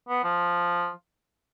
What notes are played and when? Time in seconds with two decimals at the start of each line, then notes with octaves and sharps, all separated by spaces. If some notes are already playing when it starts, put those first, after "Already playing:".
0.08 B3
0.24 F3